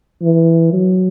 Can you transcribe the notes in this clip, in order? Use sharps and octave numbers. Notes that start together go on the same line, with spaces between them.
E3
F#3